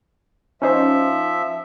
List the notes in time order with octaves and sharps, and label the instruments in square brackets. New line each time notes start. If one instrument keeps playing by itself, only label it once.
[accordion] F3 E5 [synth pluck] C#4 D#4 C5